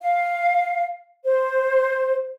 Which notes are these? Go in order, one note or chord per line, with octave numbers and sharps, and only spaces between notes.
F5
C5